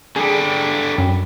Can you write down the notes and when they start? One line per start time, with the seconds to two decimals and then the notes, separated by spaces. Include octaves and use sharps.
0.16 D3 G3 G#4
0.98 F#2